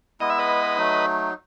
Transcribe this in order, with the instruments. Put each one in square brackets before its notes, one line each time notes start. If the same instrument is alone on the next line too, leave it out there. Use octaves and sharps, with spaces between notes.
[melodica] G#3 B3 E4 [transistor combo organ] D#5
[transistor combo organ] E5
B4 D#5
[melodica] F#3 A3 D#4